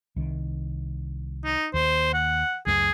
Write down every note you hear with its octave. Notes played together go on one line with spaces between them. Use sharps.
C2 D#3
D#4
D#2 C5
F#5
C#2 F#2 A3 G#4